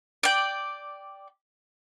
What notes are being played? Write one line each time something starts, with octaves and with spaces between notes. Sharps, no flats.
D5 G5